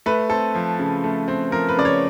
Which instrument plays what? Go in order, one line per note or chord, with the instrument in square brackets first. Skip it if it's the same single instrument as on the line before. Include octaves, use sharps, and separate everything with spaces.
[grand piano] A3 B4
C4 A4
F3
C#3
A3
C4
F3 A#4
B4
C#3 D5
C#5